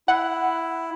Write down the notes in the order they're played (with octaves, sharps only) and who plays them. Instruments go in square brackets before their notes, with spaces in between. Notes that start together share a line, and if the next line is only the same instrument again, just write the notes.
[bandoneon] E4 [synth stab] F#5